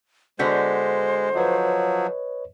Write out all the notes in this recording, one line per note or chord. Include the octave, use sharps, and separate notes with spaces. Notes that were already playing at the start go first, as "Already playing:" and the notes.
D3 G#3 B3 F#4 C5 G6 B6
F3 F#3 B4 C#5 D#5